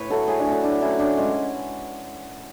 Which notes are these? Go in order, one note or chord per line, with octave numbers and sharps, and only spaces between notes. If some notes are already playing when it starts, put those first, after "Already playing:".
Already playing: A2 B4 C#5
F#3 A3 F#4 A4
A2 E4 G#4
D4 F#4
F#3 A3
F#4 A4
A2 D4
F#3 A3 C#4 E4
A2 D4
G#3 C#4